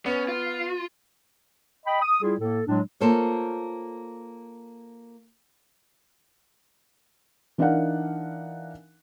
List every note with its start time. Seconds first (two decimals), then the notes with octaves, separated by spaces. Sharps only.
0.06 B3 C#4
0.28 F4
1.86 D#5 G5 B5
2.02 D#6
2.22 G3 E4 F4 G#4
2.40 A2 A#3 A4
2.67 A2 F#3 G#3 D4
3.00 A#3 F4 A4 C5 C#5
7.58 E3 D4 D#4 A#4 F5 F#5